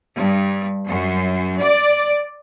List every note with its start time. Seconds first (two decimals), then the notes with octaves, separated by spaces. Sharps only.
0.13 G2
0.87 F#2
1.61 D5